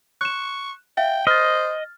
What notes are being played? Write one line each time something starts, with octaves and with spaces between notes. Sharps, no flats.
C#6 F#6 E7
E5 F5 G5
C5 D#5 F6 A6